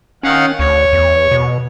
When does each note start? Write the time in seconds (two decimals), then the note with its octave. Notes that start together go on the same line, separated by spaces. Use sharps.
0.23 D#3 C#4 F5 F#5
0.59 D2 C#5
0.93 E2
1.31 B2